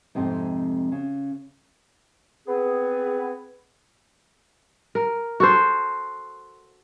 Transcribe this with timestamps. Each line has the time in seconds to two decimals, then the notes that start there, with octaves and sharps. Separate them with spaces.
0.15 F2 G#2 C3 D#4
0.92 C#3
2.47 B3 C4 G#4
4.95 A#4
5.40 F#4 A4 C5